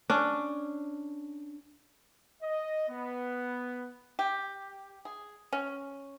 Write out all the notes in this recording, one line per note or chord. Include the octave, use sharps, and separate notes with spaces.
C#4 D4
D#5
B3
G4
G#4
C#4